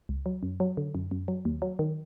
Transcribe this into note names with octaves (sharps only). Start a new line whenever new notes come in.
C#2
F#3
F#2
F#3
D3
F#2
F#2
F#3
D#2
F#3
D#3